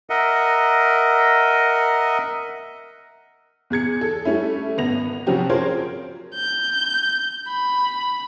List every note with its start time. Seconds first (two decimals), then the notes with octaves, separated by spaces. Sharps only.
0.10 A#4 D#5 E5 F#5
3.70 E2 G#4 G#6 C#7
4.01 A4
4.25 G3 A3 C#4 E4
4.77 G#1 B3 A#6 F7
5.27 C3 F3 F#3 C#4 F#4 G4
5.50 F4 G#4 A#4 C5 C#5
6.35 G6
7.48 B5